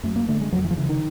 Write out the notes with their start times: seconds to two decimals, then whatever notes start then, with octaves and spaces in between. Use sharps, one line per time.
0.03 F#2 A3
0.16 A#3
0.28 D3 A3
0.41 G#3
0.52 F2 F#3
0.64 E3
0.71 F3
0.77 C#3 E3
0.89 D#3